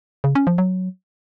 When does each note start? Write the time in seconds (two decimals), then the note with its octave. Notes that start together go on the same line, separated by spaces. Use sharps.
0.24 C#3
0.35 C#4
0.47 F3
0.58 F#3